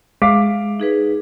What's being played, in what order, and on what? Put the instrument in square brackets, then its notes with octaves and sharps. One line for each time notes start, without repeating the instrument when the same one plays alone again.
[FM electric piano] G#3 [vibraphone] E5 [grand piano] F5 D6 B6
[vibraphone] D#4 G#4 B4